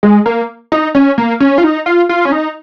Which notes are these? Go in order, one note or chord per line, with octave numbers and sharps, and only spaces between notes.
G#3
A#3
D#4
C#4
A#3
C#4
F4
D#4
F4
F4
C#4
D#4